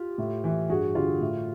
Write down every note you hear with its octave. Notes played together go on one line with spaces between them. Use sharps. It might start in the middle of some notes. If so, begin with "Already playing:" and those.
Already playing: F4 G4
A2
E3
G2 F#4 G#4
D3 F4 G4
A2